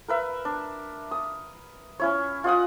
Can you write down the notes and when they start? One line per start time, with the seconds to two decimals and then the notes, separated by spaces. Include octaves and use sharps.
0.08 A#4 B4 E5
0.45 D4
1.11 D#6
2.00 C#4 E4 C#5
2.44 F4 D#5 F#5 D#6